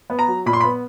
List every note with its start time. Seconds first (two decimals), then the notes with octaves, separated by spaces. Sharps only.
0.10 B3
0.19 A#5
0.28 F#3
0.46 A#2 B5
0.53 C6
0.60 B3 B5